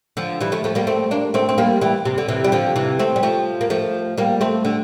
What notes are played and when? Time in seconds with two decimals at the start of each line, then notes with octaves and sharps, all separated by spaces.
0.17 D3 F3
0.41 E3 G3
0.52 F3 A3
0.64 F3 A3
0.75 G3 A#3
0.87 A3 C4
1.11 A#3 D4
1.34 A3 C4
1.49 C4
1.58 G3 A#3
1.81 E3 G3
2.05 C3
2.18 D3
2.29 C3 E3
2.44 G3
2.52 D3 F3
2.76 C3 E3
2.99 A3 C4
3.16 G3
3.23 F3 A3
3.61 A#3
3.70 F3 A3
4.18 G3 A#3
4.41 A3 C4
4.65 D3